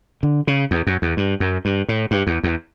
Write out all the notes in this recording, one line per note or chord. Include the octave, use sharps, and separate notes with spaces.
D3
C#3
E2
F#2
E2
G2
F#2
G2
A2
G2
E2
E2